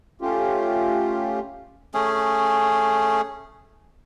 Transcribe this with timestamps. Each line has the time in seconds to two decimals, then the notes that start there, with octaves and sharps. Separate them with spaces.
0.22 A3 C#4 F4 G4
1.94 A3 C#4 G#4